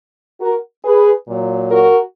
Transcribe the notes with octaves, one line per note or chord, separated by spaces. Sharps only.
F#4 A#4
G#4 B4
A#2 F#3
F#4 A#4